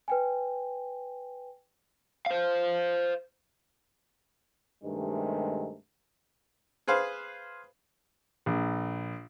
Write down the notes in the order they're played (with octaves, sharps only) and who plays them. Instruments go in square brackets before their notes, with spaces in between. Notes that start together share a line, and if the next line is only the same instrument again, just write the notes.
[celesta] B4 G5 G#5
[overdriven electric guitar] C5 F5
[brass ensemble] G2 C3 D#3 G#3 A3
[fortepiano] G#4 B4 C5 F5
A#1